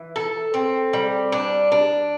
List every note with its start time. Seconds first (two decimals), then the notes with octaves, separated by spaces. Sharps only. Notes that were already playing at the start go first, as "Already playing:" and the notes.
Already playing: E3
0.16 A4
0.54 C4
0.93 G3
1.32 D4
1.72 D4